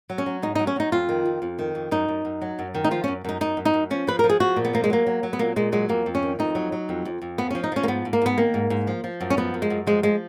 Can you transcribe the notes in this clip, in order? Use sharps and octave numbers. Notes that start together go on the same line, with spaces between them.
F#3
C#4
F#3
G#2 D#4
F#3 D#4
C#4
F#3 D#4
F2 F4
D#3
F2
F2
D#3
F2
F#2 D#4
F#2
F#2
F#3
F#2
D#3
D#4
F3 F4
C#4
F#2
F#2 D#4
F#2 D#4
F#2
D#4
F#2
F3 C#4
F3 B4
F3 A#4
G#4
F3 F#4
A#2
B3
F3 A#3
G#3
F#3 A#3
F#3
F#3
B3
A#2 A#3
A#2 G#3
F#3 G#3
F2 A#3
F2
C#4
D#3
F2 D#4
F#3
F#3
F2
F2
F2
F3 B3
C#4
F3
D#4
F3 C#4
A#3
G#2 B3
G#2
A#3
G#2 B3
D#3 A#3
G#2
G#2
F3
F3
F#2
C#4
F3 B3
F#2
G#3
F#2
F3 G#3
F3 G#3